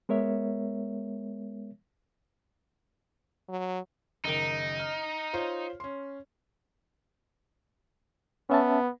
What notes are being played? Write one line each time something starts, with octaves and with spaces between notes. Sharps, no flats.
G#3 B3 A#4 C#5 E5
F#3
F#1 D#3 D#4 D7
F6
F4 C5 C#5
C#4 C6
B3 C#4 E5 A5